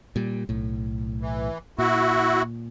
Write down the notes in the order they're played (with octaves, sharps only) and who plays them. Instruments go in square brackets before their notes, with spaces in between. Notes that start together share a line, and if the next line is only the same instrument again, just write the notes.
[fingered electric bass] A#2 G3
B1 A2
[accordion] E3
[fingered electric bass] A#2 [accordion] E4 F#4